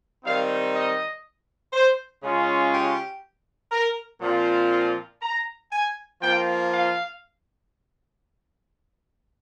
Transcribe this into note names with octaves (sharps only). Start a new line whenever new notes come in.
D#3 G3 C4 D#4 F5
D#5
C5
C#3 G#3 C#4 F4
G4
A#4
A#2 F3 C4 F4
A#5
G#5
F3 A#3 F4 G5
F5